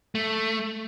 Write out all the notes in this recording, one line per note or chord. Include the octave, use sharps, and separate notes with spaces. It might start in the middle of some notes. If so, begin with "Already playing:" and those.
A3